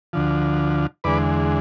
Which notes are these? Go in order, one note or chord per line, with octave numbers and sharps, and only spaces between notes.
D2 D3 F3
E2 D3 G#3 B4 D5